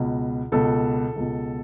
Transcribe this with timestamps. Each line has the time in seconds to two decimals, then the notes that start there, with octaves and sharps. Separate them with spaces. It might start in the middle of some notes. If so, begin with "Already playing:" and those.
Already playing: C#2 B2
0.52 C#2 B2 A4
1.16 C#2 B2